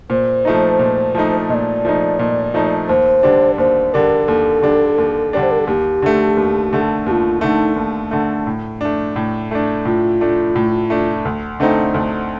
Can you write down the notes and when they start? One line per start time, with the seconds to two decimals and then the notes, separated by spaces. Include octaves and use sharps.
0.10 A#2 C5
0.45 F3 A3 D#4
0.79 A#2
1.15 F3 A3 D#4
1.49 A#2 D5 D#5
1.85 F3 A3 D#4
2.19 A#2
2.54 F3 A3 D#4
2.88 D#2 C5
3.23 D3 G3 D4
3.58 D#2 C5
3.93 D3 G3 D4 A#4
4.28 D#2 A4
4.62 D3 G3 D4
4.98 D#2
5.33 D3 G3 D4 D5
5.43 C5
5.51 A#4
5.59 A4
5.67 D#2 G4
6.02 D3 A3
6.37 D#2
6.73 D3 A3
7.06 D#2 G4
7.11 F4
7.41 D3 A3 D#4
7.76 D#2
8.11 D3 A3
8.47 A2
8.81 A3 D4
9.16 A2
9.51 A3 D4
9.85 A2 F4
10.21 A3 D4
10.56 A2
10.90 A3 D4
11.25 D2
11.60 D3 A3 C4 D#4
11.94 D2